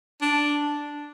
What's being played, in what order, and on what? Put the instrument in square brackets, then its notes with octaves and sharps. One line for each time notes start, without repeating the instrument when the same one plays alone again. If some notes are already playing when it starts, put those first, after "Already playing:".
[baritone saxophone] D4